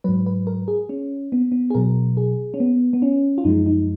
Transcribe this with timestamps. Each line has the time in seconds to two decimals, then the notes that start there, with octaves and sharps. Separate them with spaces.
0.04 G#2 F#3 B4
0.26 B4
0.47 A#4
0.68 G#4
0.89 C#4
1.32 B3
1.52 B3
1.70 G#4
1.74 B2 F#3 A#4
2.17 G#4
2.54 C#4
2.60 B3
2.93 B3
3.02 C#4
3.38 F4
3.44 F#2 F3 G#3 D#4
3.66 D#4